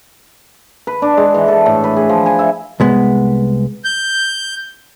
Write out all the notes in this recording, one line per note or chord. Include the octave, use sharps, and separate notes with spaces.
B4
D4
G#3
E3
A4
A2
B4
G#4
F3
G#5
E5
C2 G#3 B3
G6